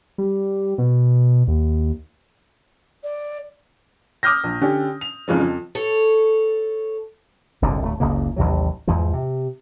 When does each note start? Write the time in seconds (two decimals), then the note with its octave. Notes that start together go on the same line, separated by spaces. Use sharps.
0.18 G3
0.78 B2
1.47 D#2
3.03 D5
4.23 D6 D#6 F6 G6 A#6
4.44 A#1
4.61 D3 C#4 G4
5.01 F7
5.28 F2 G#2 C#3 F3
5.41 F2
5.75 A4 C#5
7.62 F#1 C2 G#2 D3
7.82 D1 A3
8.00 F#1 C#2 C#3 A#3
8.36 A1 D#2 C3 F#3
8.87 E2 G#2 E3 F3
9.13 C3